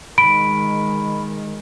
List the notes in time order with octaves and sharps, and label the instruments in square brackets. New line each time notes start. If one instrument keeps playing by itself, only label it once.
[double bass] D#3 G#3 [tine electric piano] B5 [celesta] D7